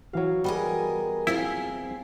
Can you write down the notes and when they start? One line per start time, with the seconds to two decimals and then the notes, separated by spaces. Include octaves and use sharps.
0.13 E3 F#3 F#4 F5
0.44 G3 B3 G#4 A#4 D#5
1.27 C4 E4 F4 G#4